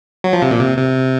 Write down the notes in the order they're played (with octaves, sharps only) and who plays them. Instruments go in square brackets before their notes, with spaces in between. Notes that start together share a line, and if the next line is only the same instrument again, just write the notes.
[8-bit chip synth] F#3
F3
C3
A#2
C3
C3